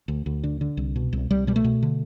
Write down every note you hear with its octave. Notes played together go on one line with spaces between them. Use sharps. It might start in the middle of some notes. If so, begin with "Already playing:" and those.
D2
D2
D3
D3
C2
B2
C2
C2 G3
B2 G3
A3
B2
D3